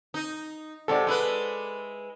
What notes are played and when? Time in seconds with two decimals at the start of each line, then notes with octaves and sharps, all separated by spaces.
0.14 D#4
0.88 G#2 C3 A4 D5
1.07 G#3 E4 B4